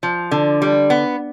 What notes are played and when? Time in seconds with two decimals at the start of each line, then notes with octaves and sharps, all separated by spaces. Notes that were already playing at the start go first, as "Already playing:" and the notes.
0.03 F3
0.31 D3
0.62 G3
0.90 B3